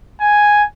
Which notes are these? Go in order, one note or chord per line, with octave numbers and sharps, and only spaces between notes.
G#5